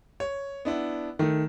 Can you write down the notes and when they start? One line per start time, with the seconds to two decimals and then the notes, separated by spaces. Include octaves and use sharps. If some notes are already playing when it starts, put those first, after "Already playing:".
0.20 C#5
0.65 B3 D4 E4
1.19 D#3 A3